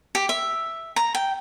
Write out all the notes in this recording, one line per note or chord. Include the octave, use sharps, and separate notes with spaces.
G4
E5
A#5
G5